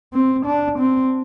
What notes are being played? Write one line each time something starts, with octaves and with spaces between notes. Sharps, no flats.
C4
D4
C4